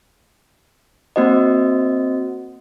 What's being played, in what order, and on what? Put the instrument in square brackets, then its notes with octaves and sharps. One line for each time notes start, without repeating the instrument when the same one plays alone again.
[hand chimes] A#3 C4 F#4 C5 D#5